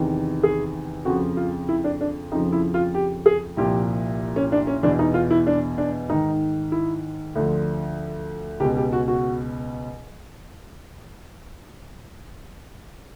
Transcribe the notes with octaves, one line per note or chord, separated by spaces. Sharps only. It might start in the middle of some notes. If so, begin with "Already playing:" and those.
Already playing: E2 C3 D#3
G#4
F2 C#3 F3 F#4
F4
E4
D4
D4
F2 C#3 F3 D#4
E4
F4
G4
G#4
C2 A#2 F3 G4
C#4
D4
C#4
E2 B2 D4
D#4
F4
E4
D4
D4
G#2 D#3 D#4
E4
D2 D3 F3
C#2 B2 G4
G4
F#4
F#4